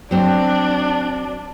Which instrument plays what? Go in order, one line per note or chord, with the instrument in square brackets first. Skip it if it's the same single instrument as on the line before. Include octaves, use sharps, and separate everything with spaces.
[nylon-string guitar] F#3 C4 [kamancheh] D4